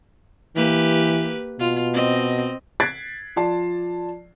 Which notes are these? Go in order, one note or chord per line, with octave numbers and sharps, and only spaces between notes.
E3 A#3 G4 B4
B2 F4
C4 D#5
F#6 G#6 A6 B6 C7 D7
F3 F4 D5 A5 C7